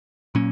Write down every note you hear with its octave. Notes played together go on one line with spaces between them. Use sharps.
A#2 F#3 A#3 C#4